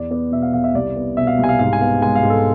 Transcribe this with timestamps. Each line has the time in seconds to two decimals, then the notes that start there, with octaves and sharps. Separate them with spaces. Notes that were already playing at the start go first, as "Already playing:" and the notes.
Already playing: E2 D5
0.11 B3 D5
0.31 B2 E5
0.42 F5
0.53 E2 F5
0.64 E5
0.74 C2 D5
0.96 B3
1.17 B2 E5
1.27 F5
1.38 C2
1.44 G#5
1.49 F5
1.59 G#2 F5
1.73 G#5
1.81 B3 F5
2.02 G#3 G#5
2.15 F5
2.23 G#2
2.30 A4